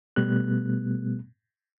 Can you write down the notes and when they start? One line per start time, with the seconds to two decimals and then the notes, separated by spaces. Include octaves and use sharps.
0.16 B2 G3 A3 B3 F#6